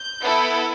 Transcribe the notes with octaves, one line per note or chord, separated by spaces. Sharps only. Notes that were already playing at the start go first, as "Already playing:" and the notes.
Already playing: G6
B3 E4 A4